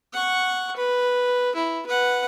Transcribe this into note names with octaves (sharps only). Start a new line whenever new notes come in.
F#5 C#6
B4
E4
B4 F#5